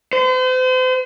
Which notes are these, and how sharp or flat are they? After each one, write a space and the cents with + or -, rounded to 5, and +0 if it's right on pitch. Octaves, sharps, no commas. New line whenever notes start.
C5 -40